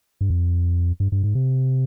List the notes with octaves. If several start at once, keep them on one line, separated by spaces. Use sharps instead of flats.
G2
F2
G2
G2
G#2
C3